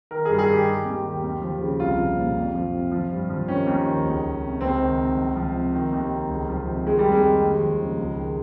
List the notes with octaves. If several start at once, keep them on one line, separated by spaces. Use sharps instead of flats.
D#3 A#4
G2 G#4
G#4
D#3 G4
D#3
D#2
D#3
D#2
F3
C#3
C2 F4
F3
A#2
F2
F3
C3
F3
G2
F3
D#3 C#4
D#2
D#3
C#2
D#3
C3
C#2 C4
D#3
C3
C#2
F3
C3
D#3
D#2
D#3
C#2
F3
C3
D#3 G#3
G3
F2
G#3
D#3
D#2
F3
C#3
C#2
D#3